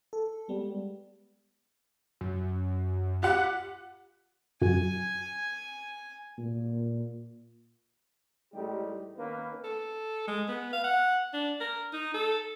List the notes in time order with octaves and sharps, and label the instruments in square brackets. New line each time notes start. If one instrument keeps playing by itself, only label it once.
[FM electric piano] A4
[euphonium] G3 [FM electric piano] G#3 B3
[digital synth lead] F#2
[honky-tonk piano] F4 F#5 [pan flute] G4 [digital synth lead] F#6
[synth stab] F#2 [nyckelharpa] G#5
[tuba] A#2
[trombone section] A1 A2 G3 G#3 D#4 G4
D#3 A#3 B3 C#4 B4
[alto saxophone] A4
G#3
B3
F5
F#5
D4
A#4
D#4
A4